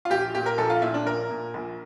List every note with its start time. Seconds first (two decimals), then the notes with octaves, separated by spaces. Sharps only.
0.05 F4
0.10 A#1 G4
0.35 A#2 G4
0.46 A#4
0.58 A#1 A4
0.70 F4
0.82 A#2 E4
0.94 D4
1.05 A#1 A#4
1.30 A#2
1.54 A#1